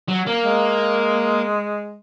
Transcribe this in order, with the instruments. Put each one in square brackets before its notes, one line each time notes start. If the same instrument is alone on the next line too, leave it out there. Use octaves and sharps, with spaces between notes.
[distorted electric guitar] F#3
A#3
[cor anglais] G#3